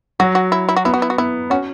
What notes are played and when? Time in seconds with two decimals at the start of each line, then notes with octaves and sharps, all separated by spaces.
0.20 F#3 F#4
0.35 F#4
0.52 E4
0.69 E4
0.76 F#4
0.85 B3 E4
0.94 F#4
1.02 E4
1.10 F#4
1.18 B3 E4
1.50 C#4 F#4